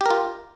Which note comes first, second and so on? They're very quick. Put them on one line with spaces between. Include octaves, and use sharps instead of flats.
G4 A#4 F4